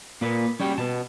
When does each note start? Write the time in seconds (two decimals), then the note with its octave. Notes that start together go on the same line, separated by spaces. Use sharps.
0.21 A#2 A#3 B4
0.60 G3 C#4 F#4 G5
0.78 B2 A5